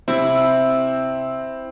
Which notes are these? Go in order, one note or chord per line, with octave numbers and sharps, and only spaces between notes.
C3 C4 E4